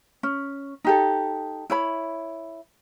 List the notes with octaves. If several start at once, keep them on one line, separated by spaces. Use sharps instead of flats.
C#4
D#4 G4 A4
E4 C#5 B5